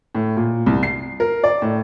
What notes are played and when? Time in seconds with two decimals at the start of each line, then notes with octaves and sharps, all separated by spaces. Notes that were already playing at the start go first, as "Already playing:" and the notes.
0.15 A2
0.37 A#2
0.66 C2
0.83 C7
1.20 A#4
1.44 D5
1.62 A2